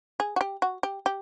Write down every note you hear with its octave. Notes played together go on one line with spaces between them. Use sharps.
G#4
F#4
G4
F#4
G4
G4